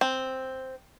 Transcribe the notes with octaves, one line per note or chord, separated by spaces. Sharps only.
C4